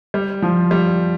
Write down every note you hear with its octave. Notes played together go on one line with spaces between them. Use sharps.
G3
F3
G3